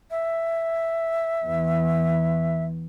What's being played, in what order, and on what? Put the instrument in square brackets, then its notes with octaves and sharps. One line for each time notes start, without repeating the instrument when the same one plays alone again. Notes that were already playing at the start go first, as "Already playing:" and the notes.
[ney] E5
[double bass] E2